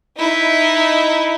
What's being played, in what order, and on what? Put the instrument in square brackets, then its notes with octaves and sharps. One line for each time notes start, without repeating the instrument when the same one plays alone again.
[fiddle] D#4 E4